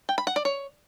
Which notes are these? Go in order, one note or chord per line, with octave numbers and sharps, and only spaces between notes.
G5
B5
F#5
D5
C#5